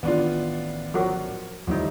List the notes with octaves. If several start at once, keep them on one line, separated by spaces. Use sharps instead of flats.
A1 D#3 E3 B3 D4 F4
F3 F#3 F#4 A#4 C#5
D#2 A2 D3 F3 G3 D#4